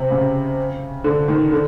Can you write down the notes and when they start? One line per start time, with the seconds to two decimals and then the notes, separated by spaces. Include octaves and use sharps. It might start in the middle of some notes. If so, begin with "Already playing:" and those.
Already playing: C3
0.10 C#3
1.04 D3
1.28 D#3
1.52 D3